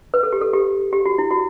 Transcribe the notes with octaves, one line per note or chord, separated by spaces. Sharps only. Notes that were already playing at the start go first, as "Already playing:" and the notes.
B4
A4
G4
A4
G4
G4
F#4
E4
F#4